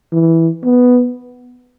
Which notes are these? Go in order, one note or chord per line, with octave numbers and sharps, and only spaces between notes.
E3
B3